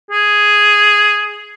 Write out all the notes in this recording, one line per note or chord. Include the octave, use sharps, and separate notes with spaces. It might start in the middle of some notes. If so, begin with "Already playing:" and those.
G#4